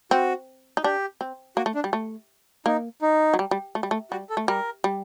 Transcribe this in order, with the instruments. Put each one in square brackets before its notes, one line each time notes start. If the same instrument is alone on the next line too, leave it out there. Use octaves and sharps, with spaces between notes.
[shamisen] C4 [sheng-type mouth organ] F#4
[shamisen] D#4
[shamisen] D4 [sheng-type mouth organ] G4
[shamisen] C4
[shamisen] A#3 [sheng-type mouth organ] F#4
[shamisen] A3
[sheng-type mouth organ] D4
[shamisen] G3
A3
[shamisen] A#3 [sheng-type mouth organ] D#4
[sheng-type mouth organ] D#4
[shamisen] F#3
G3
G3
A3
G3
A3
[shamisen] G3 [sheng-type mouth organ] F#4
[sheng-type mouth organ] A4
[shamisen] A3
[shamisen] G3 [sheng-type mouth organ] A#4
[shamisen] G3